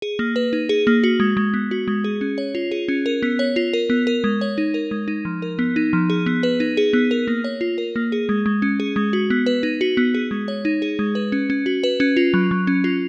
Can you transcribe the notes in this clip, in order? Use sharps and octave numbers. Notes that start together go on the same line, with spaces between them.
G#4
A#3
B4
D#4
G#4
A#3
F#4
G#3
G#3
B3
F#4
G#3
G#4
C#4
C#5
F4
G#4
C#4
A#4
B3
C#5
F4
A#4
B3
A#4
G#3
C#5
D#4
A#4
G#3
D#4
F3
A#4
B3
D#4
F3
G#4
B3
B4
D#4
G#4
B3
A#4
A#3
C#5
F4
A#4
A#3
G#4
G#3
G#3
C#4
G#4
G#3
F#4
B3
B4
D#4
F#4
B3
G#4
G#3
C#5
D#4
G#4
G#3
B4
C#4
C#4
F#4
B4
C#4
F4
F#3
F#3
C#4
F4